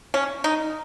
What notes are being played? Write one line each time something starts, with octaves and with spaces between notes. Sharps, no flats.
C#4
D#4